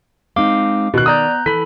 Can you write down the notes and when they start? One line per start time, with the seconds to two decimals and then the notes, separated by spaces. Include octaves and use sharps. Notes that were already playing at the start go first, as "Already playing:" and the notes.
0.36 G#3 C4 D#4 F5 D6
0.94 B2 D#3 F#6
1.06 B3 D5 A#5 D#6 G6
1.46 E3 A4 B5 B6